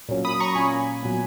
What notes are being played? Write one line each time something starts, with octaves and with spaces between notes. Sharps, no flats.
A#2 F#3 C#4
B5 D#6
A#5 C#6
A#2 A#3 C#4 G#5 B5
A#2 F#3 B3